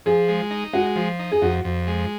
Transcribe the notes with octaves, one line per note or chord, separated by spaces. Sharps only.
F3 G#4
G#3
D#4
G#3 F#4
F3
D#4
G#4
F2 F#4
F2
G#3